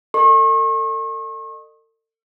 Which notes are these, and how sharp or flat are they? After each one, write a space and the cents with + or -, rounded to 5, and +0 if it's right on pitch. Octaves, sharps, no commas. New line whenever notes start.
A4 +40 D#5 -40 C#6 -40